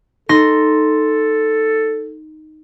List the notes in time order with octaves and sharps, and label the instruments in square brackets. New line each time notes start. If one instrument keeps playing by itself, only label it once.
[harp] D#4 C6 A#6 [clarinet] A4